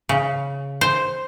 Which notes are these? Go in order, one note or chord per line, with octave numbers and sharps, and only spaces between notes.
C#3
C5